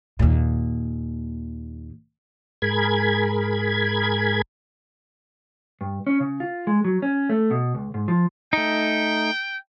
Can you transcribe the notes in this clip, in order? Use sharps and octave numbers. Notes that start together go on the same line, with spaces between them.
D#2 A#2
G#2 G#4 A#4 B5 G#6
G2
C#4
C#3
F4
G#3
F#3
C#4
A3
B2
C#2
G#2
F3
A3 D#4 G5